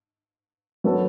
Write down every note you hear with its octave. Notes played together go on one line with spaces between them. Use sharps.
F#3 B3 F#4 A4